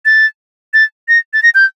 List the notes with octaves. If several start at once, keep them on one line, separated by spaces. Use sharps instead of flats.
A6
A6
A#6
A6
A#6
G6